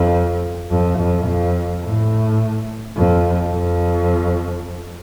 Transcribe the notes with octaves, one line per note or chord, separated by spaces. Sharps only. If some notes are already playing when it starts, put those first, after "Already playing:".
Already playing: F2
F2
F2
F2
A2
F2
F2